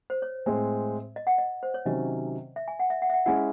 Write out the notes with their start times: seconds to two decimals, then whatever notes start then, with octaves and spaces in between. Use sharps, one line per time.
0.10 C5
0.22 C#5
0.46 A2 G#3 C4
1.16 D#5
1.27 F#5
1.38 D#5
1.63 C5
1.74 C#5
1.85 C3 D#3 F#3 C#4 D#5
2.56 E5
2.68 G#5
2.79 F#5
2.90 E5
3.02 F#5
3.10 E5
3.14 F#5
3.26 G#3 C#4 E4 F#5